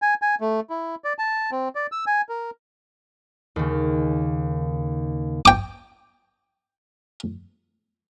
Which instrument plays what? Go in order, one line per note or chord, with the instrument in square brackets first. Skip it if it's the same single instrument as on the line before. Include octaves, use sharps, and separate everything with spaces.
[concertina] G#5
G#5
A3
E4
D5
A5
C4
D5
E6
G#5
A#4
[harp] D#2 C#3
[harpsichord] G5 D6